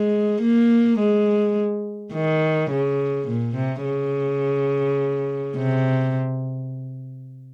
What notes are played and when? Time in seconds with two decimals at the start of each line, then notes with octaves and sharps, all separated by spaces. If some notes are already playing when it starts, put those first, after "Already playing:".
Already playing: G#3
0.42 A#3
0.99 G#3
2.13 D#3
2.71 C#3
3.28 A#2
3.56 C3
3.84 C#3
5.56 C3